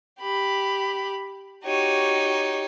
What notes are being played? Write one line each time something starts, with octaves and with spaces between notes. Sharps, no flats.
G4 B5
D#4 F#4 G4 C#5